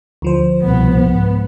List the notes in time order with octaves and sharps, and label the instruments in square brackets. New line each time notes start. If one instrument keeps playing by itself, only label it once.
[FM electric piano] D2 F3 C5
[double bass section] C2 B2 B3
G#2 B3